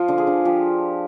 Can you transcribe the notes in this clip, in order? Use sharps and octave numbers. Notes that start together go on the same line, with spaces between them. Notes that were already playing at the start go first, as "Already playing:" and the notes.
Already playing: F3 F4
D3
G#4
D3
F3 G4